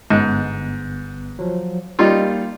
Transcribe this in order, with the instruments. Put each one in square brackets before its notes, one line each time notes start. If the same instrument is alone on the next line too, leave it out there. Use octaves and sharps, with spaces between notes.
[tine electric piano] G1 B3 F#6 [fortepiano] G#2
[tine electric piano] F3 F#3
[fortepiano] G3 D#4 F4 [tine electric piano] A#3